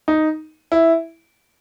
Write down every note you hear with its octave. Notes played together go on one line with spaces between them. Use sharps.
D#4
E4